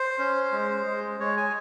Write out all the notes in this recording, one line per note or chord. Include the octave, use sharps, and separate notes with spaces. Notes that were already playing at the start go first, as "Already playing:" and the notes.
Already playing: C5
C#4
G#3
G#3
G#3 C#5
G#5